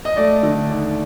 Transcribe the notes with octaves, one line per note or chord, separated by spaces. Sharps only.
D#5
A3 D5
D3
D#2